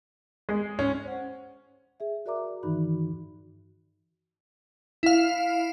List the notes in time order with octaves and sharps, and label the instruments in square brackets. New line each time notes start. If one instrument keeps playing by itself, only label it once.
[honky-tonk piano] G#3
[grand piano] C#4
[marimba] C5 F#5
G#4 E5
F#4 A#4 D5 E5 A#5 D6
G2 D#3 E3 D#4 F#4 B5
[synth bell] E4 F5